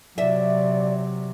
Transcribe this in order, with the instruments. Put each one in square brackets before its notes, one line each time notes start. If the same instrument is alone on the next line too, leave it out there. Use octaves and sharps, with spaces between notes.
[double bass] C3 F#3 [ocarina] D5 [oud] E5